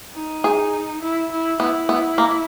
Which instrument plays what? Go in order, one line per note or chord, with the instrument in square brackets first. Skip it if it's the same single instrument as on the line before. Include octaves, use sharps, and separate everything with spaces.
[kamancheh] D#4
[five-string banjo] G#4
[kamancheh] E4
E4
[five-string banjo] B3 [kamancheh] E4
[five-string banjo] B3
A#3